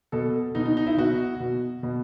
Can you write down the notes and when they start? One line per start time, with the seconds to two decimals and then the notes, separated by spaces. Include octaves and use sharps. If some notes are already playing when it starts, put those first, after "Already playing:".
0.12 B2 A4
0.55 B2 D#4
0.66 D#4
0.77 D#4
0.87 E4
0.97 B2 F#4
1.40 B2
1.83 B2